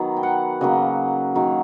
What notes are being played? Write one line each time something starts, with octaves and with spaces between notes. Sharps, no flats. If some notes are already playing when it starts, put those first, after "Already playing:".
Already playing: D#3 F#3 B3
G5
F#5
C#3 F#3 A#3 D#5
D#3 F#3 A#3